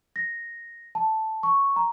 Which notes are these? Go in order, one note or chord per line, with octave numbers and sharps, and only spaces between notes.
A#6
A5
C#6
A#5